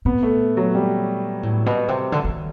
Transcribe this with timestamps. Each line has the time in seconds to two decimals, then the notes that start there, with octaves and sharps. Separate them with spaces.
0.05 A#2 B3
0.23 A3
0.57 F#3
0.75 G3
1.43 A2
1.66 B2
1.88 C3
2.12 D3
2.24 D3
2.29 D#3